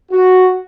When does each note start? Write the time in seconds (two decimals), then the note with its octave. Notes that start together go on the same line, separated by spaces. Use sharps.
0.11 F#4